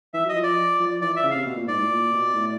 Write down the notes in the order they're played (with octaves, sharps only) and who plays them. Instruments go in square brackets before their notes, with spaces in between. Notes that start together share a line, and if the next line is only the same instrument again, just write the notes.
[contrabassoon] E3 [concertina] E5
[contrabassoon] F#3 [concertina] D#5
[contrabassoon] F3
[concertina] D5
[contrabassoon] F3
[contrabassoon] E3 [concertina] D5
[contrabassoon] E3 [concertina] E5
[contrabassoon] C#3
[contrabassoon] C3 [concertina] F5
[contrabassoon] B2
A#2
[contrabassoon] G#2 [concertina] D5
[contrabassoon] A2
A#2
B2
A2